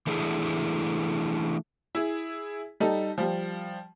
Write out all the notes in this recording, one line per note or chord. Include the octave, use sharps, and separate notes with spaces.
E3 A3 D4 E4 G#4
E4 G#4
G3 D#4 A4
F3 G3